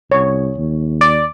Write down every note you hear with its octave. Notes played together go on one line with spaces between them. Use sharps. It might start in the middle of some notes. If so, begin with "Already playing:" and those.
C2 C#5
D#2
D5